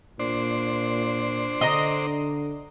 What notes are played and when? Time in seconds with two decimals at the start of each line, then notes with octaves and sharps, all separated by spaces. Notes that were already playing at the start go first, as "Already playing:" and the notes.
0.20 A#2 D4 C5
1.61 D3 D#5 A#5